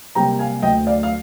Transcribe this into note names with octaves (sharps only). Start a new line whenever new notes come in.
C3 G3 A#3 G5 A#5
F5 G#5
D2 D#5 G5
D5 F5
F5